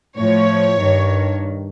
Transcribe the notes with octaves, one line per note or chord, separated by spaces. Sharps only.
A2 F3 C#5
G2 D#3